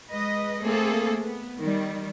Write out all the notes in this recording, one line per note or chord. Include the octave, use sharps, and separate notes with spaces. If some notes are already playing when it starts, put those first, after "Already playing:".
G#3 B4 D#5
A3 A#3 C4 G#4 A4
B3
D#3 G3